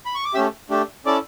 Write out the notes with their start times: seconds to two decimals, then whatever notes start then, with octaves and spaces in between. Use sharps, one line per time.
0.06 B5
0.15 C#6
0.25 D6
0.34 A3 C#4 G4 E5 E6
0.70 A3 D4 G4
1.06 C#4 E4 A4 D5 D6